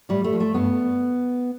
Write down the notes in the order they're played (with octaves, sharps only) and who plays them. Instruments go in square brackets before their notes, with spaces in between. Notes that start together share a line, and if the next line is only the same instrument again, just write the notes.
[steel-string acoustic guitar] A2 G3
A3
F3
A3
G2 B3